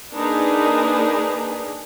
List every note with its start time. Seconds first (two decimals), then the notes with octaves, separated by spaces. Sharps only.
0.14 A#3 D4 D#4 G#4 A#4 B4